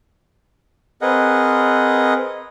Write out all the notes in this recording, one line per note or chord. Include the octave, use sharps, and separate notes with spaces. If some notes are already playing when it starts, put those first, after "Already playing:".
C4 G#4 A#4 B4 D#5 F#5